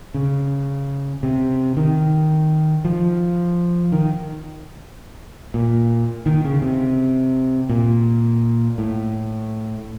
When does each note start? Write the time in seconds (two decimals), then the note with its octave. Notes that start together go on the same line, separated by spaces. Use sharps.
0.14 C#3
1.23 C3
1.77 D#3
2.85 F3
3.92 D#3
5.54 A#2
6.26 D#3
6.45 C#3
6.62 C3
7.69 A#2
8.78 A2